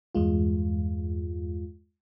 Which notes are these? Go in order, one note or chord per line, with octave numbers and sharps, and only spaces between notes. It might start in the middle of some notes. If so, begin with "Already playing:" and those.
E2 G2 G#3 F4